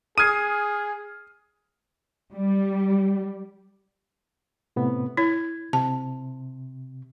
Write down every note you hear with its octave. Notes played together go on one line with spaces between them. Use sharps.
G#4 D#6 F6 G#6 C7 D#7
G3
A2 C3 B3
E4 C#5 G#6
C3 A5